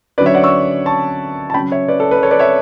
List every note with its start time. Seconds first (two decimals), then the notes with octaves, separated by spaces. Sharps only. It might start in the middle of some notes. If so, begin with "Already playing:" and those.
0.18 D3 F#3 C#4 B4 D5
0.26 C#5 E5
0.35 D5 F#5
0.44 C#6 E6
0.86 A5 C#6
1.50 A5
1.54 C#3 F#3 C#4 G5 B5
1.72 C#5 E5
1.88 B4 D5
2.00 A4
2.11 B4
2.23 A4 C#5
2.31 B4 D5
2.39 C#5 E5